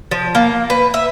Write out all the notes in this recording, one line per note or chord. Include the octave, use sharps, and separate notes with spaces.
F3
A#3
B4
E5